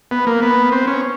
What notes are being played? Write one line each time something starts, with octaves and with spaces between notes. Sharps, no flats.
B3
A#3
B3
C4
C#4